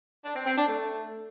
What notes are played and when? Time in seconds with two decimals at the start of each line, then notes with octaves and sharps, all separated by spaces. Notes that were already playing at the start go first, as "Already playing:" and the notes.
0.25 D4
0.36 C4
0.46 C4
0.57 D4
0.68 A3